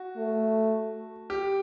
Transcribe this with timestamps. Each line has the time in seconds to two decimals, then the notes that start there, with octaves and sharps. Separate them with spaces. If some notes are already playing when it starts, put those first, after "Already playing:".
Already playing: F#4
0.17 A3
1.30 G4